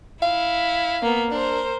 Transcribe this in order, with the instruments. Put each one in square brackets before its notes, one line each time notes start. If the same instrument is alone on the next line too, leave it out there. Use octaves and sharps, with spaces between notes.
[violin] E4 [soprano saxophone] F5
[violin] A#3 B3
[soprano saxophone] D4 [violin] A#4 C5